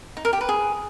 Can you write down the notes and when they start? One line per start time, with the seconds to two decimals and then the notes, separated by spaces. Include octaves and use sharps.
0.17 D#4
0.25 A#4
0.33 G4
0.41 B4
0.49 G#4